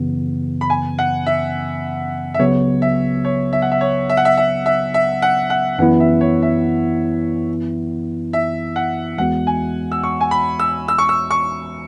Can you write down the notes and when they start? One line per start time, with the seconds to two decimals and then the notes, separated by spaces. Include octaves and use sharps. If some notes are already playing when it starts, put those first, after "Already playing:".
Already playing: F#2 C#3 E3 B3
0.61 B5
0.70 G#5
0.99 F#5
1.26 E5
2.34 E5
2.39 C#2 C#3 F#3 B3 C#5
2.82 E5
3.25 C#5
3.53 E5
3.62 F#5
3.72 E5
3.81 C#5
4.09 E5
4.17 F#5
4.25 E5
4.37 E5
4.66 E5
4.94 E5
5.22 F#5
5.50 F#5
5.79 F#2 E3 B3 E4 F#5
6.00 E5
6.21 C#5
6.42 E5
8.33 E5
8.76 F#5
9.18 E2 E3 G#3 B3 F#4 F#5
9.47 G#5
9.92 E6
10.03 C#6
10.21 G#5
10.31 B5
10.59 E6
10.88 E6
10.98 C#6
11.09 E6
11.31 C#6